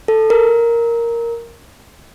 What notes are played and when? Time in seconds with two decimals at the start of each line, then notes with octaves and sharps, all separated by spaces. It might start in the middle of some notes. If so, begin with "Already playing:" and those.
0.08 A4
0.30 A#4